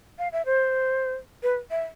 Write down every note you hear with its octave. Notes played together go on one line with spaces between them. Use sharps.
F5
E5
C5
B4
E5